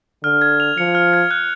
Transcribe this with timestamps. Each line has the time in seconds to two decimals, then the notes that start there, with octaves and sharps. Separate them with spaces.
0.23 D3 F6
0.42 G#6
0.60 F7
0.77 F3 C#7
0.95 F6
1.13 G#6
1.31 F#6